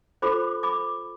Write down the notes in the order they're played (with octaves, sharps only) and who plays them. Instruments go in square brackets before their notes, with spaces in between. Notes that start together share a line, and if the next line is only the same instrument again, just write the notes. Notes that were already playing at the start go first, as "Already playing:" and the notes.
[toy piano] F4 A4 C5 B5 D6
B5 D6